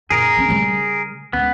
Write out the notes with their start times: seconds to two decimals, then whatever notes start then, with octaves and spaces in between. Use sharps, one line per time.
0.10 F#2 A#2 G#4 A#4
0.37 B3 C#4
0.49 C#3 G3
1.33 C#2 B3